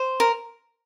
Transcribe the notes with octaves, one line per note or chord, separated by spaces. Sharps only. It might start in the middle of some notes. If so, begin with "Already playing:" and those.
Already playing: C5
A#4